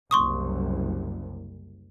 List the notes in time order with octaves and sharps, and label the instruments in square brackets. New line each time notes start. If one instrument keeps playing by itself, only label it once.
[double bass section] F#1 C2 [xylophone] C6 C#6 D#6